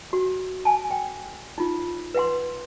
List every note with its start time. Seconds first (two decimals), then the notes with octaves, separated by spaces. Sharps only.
0.13 F#4
0.65 G#5 A5
0.91 G5
1.58 D#4 F4
2.14 B4 E5 F#5 C6